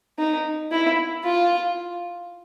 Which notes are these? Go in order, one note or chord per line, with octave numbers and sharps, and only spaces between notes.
D#4
E4
F4